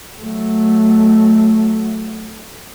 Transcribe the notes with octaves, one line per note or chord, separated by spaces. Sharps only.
F#3 A3